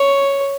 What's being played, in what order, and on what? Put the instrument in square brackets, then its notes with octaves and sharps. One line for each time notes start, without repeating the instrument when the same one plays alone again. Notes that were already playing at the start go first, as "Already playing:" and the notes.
Already playing: [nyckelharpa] C#5